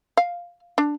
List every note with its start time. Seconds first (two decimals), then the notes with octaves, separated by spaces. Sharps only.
0.17 F5
0.78 D4